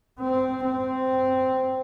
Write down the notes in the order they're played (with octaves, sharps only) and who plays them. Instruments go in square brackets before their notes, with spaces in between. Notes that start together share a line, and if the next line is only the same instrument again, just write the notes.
[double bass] C4
C4